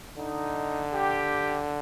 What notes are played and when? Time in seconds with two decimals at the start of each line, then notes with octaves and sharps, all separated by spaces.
0.17 D3 D#4
0.93 G4